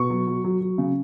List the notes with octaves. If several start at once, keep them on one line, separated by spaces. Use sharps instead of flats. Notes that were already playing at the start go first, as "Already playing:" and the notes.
Already playing: B2 C#6
F#3
F#3
F#3
F#3
C#3